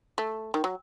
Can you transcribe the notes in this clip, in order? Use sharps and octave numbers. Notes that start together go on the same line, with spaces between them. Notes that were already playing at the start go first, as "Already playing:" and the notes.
A3
D#3
F#3